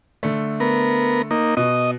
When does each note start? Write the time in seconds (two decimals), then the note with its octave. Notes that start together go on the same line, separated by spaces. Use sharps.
0.23 D3 A3
0.60 B3 A#4
1.31 A#3 D#4
1.57 B2 D#5